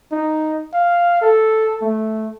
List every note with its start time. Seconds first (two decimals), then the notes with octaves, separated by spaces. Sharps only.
0.12 D#4
0.74 F5
1.22 A4
1.82 A3